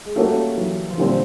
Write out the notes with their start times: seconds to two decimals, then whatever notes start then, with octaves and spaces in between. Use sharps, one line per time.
0.05 G#3
0.16 G3 A3 A#3 C#4 F#4 A4
0.57 E3 F#3
0.90 F3
0.98 A#2 D3 E3 G3 C4